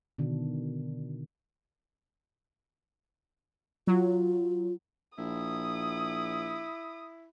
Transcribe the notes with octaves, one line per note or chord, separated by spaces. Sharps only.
B2 D3 D#3 D4
F#3 F4
A#1 E4 D#6